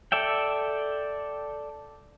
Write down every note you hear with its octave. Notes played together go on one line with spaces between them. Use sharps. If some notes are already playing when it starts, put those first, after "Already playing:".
A4 D5 E5 G5